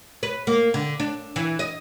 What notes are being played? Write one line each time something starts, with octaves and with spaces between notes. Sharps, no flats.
B4
A#3
D3
D4
E3
D#5